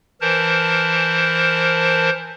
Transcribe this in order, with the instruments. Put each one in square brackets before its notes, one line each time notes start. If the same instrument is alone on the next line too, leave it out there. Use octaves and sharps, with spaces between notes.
[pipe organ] E3 A#4 C5 A5